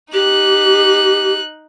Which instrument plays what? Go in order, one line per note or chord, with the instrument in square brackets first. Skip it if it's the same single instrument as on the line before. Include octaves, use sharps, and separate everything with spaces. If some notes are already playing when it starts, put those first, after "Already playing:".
[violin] D#4 F#6 [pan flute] G4